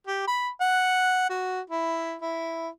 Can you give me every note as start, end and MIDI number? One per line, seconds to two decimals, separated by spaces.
0.07 0.23 67
0.27 0.49 83
0.61 1.27 78
1.30 1.61 66
1.70 2.15 64
2.22 2.68 64